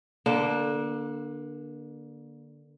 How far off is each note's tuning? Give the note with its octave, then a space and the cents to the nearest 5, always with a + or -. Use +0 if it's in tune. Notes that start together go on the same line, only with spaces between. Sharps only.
D3 +0 A#3 +30 D4 +0